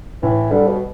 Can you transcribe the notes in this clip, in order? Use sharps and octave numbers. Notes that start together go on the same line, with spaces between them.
A2 E3
D3 G3 B3
B2